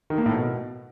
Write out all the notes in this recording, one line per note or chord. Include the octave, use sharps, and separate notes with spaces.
D#3
A#3
A2
B2